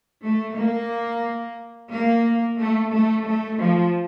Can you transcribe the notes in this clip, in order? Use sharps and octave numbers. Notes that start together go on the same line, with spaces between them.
A3
A#3
A#3
A3
A3
A3
F3